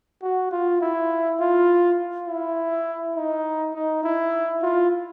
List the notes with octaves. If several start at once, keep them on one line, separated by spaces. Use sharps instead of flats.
F#4
F4
E4
F4
E4
D#4
D#4
E4
F4